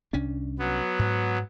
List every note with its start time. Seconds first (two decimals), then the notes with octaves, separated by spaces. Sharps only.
0.13 C2 C#4 D4
0.59 F#3 B3
0.99 G#2